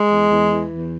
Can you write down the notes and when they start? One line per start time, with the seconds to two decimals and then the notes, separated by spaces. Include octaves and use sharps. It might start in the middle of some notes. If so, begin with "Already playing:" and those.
Already playing: G#3
0.09 E2
0.29 E2
0.49 E3
0.68 E2